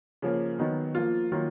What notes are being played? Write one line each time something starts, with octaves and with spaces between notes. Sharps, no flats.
C#3 F3 A#3
D#3 F#3 B3 D#4
F3 A#3 F4
D#3 F#3 A#3 F4